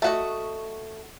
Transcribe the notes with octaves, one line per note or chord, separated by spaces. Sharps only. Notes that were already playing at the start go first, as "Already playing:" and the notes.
A3 F#4 D#5